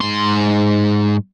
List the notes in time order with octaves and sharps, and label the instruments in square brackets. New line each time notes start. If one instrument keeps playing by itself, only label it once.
[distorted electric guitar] G#2 C6